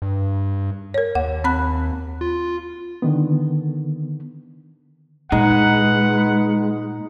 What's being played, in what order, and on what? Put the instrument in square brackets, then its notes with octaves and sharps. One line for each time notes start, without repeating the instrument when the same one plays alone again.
[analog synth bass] G2
[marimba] A#4 C#5
[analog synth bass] D#2 [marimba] F#5
[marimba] C4 B5 F#6
[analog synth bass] F4
[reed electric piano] D3 D#3 B3
[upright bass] A#2 [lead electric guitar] G#3 [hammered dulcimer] D#4 [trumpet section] B4 F#5